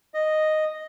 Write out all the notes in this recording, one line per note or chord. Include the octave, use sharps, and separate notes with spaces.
D#5